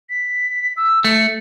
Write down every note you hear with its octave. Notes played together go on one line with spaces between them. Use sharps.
B6
E6
A3 C#7